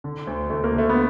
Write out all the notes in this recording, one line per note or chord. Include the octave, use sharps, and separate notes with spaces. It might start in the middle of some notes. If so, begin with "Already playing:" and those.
D3
D2
D2 A3
A#3
D3 A3
B3